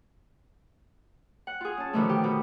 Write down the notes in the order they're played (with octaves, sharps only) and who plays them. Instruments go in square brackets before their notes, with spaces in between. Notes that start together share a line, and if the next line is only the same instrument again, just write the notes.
[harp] F#5
F4 G#4
C#4 A5
B2 D3 D#3 F3 A3
G4
B2